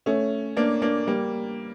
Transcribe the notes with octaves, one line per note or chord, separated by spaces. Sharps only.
A3 C#4
A#3 D4
A#3 D4
G3 A#3